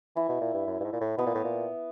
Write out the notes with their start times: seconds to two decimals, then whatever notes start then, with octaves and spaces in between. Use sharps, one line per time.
0.16 E3 E4
0.29 B2
0.41 A#2
0.54 G2
0.67 F#2
0.80 G2
0.84 G#2
0.93 A#2
1.01 A2
1.18 B2 B3
1.26 A#2
1.35 A2
1.44 A#2